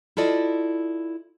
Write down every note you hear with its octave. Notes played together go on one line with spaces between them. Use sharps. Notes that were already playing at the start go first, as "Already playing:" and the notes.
E4 F4 A4 D5 D#5